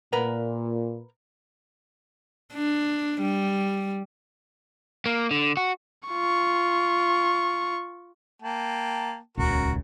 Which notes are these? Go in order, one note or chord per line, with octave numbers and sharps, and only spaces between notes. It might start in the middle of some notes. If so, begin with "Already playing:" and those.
A#2 A#4 B4 F#5
D4
G3
A#3
D3
F#4
F4 C#6
A#3 G5 A5
D#1 C#2 C#3 F#4 A#4